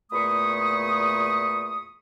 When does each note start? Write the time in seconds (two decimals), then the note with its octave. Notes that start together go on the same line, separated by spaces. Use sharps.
0.12 E2 A#2 A3 B5 C#6 D#6